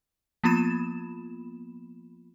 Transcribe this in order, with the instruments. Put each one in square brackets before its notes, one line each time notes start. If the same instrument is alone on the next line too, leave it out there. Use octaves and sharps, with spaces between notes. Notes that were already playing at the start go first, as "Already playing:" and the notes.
[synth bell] F3 A#3 B3 F4 B5 E7